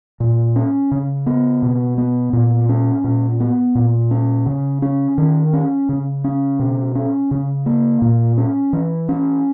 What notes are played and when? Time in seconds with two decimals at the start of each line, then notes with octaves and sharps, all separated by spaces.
0.20 A#2
0.56 C#4
0.91 C#3
1.26 B3
1.62 B2
1.98 B3
2.33 A#2
2.69 C#4
3.04 A#2
3.40 B3
3.75 A#2
4.11 C#4
4.46 C#3
4.82 C#4
5.18 D#3
5.53 C#4
5.89 C#3
6.24 C#4
6.59 B2
6.95 C#4
7.31 C#3
7.66 A#3
8.02 A#2
8.38 C#4
8.73 E3
9.09 C#4